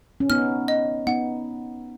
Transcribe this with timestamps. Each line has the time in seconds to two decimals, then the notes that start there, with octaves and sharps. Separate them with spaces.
0.20 C#4
0.30 B3 D#4 F6
0.68 D#5
1.07 B3 D#4 F#5